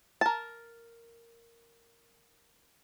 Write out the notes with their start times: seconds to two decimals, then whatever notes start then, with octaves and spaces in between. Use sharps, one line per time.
0.21 A#4 A5